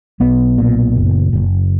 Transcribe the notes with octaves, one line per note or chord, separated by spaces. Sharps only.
B1 B3
A#2
F#1
F#1